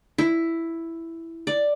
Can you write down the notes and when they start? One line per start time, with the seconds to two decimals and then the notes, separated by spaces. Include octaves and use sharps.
0.18 E4
1.47 D5